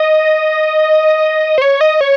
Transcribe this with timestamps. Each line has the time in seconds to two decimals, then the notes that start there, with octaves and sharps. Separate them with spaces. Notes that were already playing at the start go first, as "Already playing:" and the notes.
Already playing: D#5
1.58 C5
1.62 C#5
1.81 D#5
2.01 C#5